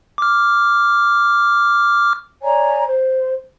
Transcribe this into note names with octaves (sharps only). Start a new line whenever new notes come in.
D6 F6
C#5 D5 G#5 A#5
C5